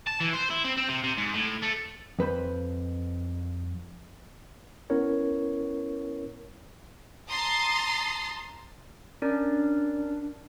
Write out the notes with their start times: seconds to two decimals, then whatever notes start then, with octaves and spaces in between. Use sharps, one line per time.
0.07 A5
0.20 E3
0.33 C5
0.50 E4
0.64 C4
0.77 C4
0.88 C3
1.04 C3
1.17 G#2
1.34 A2
1.62 A3
2.19 F2 B4 C5 B5
4.90 B3 C#4 E4 A#4 C#5
7.30 A5 A#5 C6 D#6 A6 C7
9.22 C#4 D4 A#4 D5